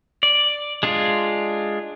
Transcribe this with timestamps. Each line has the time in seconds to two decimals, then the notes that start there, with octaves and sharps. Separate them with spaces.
0.23 D5
0.83 G#3 D4 F4